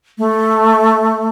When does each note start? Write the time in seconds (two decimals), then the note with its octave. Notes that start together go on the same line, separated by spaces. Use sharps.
0.18 A3